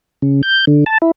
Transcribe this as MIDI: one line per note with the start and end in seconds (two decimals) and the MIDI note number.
0.22 0.42 49
0.43 0.65 91
0.67 0.84 50
0.86 0.98 81
1.02 1.11 64